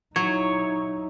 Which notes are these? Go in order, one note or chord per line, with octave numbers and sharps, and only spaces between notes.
F#3 D#4 E4 C#5